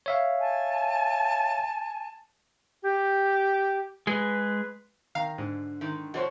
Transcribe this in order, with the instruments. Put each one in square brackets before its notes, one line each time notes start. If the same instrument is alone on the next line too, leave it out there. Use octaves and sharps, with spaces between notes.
[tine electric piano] C#5 E5 F5
[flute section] G#5 A5
[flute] G4
[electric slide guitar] G#3 G#4 [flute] B4
[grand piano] D#3 A#5 [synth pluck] F5
[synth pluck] G#2 [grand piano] D3
[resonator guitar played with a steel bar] D#3 G#3
[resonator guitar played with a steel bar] B2 F3 C5 [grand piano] F#4 C#5 C#6